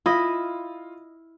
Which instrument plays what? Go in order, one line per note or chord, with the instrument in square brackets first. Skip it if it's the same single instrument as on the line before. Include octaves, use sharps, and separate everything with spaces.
[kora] E4 D#5 [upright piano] F4